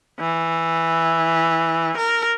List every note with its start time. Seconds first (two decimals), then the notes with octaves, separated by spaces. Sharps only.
0.20 E3
1.97 A#4